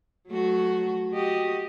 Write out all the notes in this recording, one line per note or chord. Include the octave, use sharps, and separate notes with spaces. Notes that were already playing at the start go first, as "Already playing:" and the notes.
F#3 A3 F#4
F#4 G4 D#5